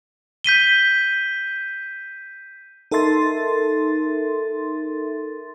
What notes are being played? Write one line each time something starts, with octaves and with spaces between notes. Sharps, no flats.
G6 B6 D#7 G7
D#4 A4 A#4 E5 C6 A6